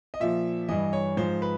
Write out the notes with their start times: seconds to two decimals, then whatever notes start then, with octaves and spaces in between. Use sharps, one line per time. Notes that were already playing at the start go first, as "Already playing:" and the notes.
0.14 D#5
0.20 A#2 F3 E5
0.69 G2 E3 D#5
0.93 C#5
1.17 G#2 F3 C5
1.42 B4